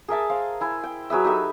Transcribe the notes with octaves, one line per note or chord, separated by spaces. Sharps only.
G#4 A#4 E5 A5
C5 F5
E4 G#5
G5
F#3 G#4 B4 E5
D#4 G4 A4 E5